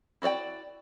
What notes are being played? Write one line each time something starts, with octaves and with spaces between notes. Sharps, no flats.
E4 F#4 C#5 D5 G5